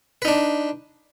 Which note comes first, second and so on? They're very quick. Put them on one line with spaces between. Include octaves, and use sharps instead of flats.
B4 D#4 D4